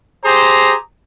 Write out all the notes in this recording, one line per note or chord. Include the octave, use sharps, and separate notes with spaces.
G4 G#4 C5 A#5